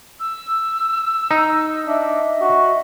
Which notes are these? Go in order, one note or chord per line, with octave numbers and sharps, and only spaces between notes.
E6
D#4
D4 D#5 E5
F#4